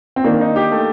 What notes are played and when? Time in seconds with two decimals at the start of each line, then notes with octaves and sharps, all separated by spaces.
0.16 C4
0.24 D#3 A#3 D4
0.41 D#4
0.56 G4
0.72 A3